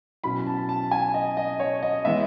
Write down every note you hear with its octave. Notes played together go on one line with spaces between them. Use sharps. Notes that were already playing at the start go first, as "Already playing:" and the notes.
B2 F#3 C#4 E4 B5
A5
A5
G#5
D#5
D#5
C#5
D#5
E3 G#3 B3 E5